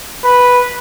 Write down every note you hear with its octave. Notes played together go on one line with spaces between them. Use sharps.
B4